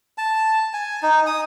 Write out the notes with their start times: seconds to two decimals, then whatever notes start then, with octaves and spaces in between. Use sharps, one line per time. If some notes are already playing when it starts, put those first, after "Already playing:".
0.18 A5
0.73 G#5
1.03 D#4
1.27 D#6